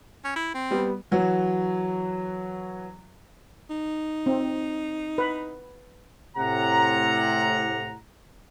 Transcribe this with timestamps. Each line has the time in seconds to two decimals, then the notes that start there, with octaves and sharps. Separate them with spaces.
0.25 C#4
0.36 E4
0.54 C4
0.71 G3 B3
1.11 E3 F#3 F#4
3.70 D#4
4.26 C4
5.18 B4
6.37 A2 C3 F#5 A#5